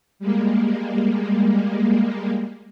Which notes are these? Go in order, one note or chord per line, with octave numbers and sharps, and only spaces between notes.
G3 G#3 A#3